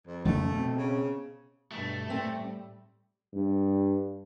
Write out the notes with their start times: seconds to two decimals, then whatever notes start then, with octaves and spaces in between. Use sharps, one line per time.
0.07 F2
0.25 F2 C#3 A3
0.52 B2 C4
0.78 C#3
1.71 G2 B2 A3
2.10 A2 G3 C4
3.33 G2